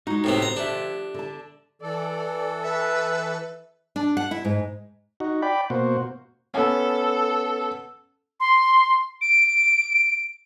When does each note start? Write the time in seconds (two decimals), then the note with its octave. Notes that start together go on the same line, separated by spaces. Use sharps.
0.07 G#3 D#4 F#4
0.24 A2 C3 B3
0.42 D3 C5 A#5
0.56 D4 G4 A4 E5
1.14 D3 A5
1.82 E3 A4 D5
2.63 B4 E5
3.96 D4
4.17 F#5
4.31 E4
4.45 G#2
5.20 D#4 F#4
5.42 D5 G5 B5
5.70 B2 A#3 F#4 C5
6.54 B3 C#4 A4
8.40 C6
9.21 D7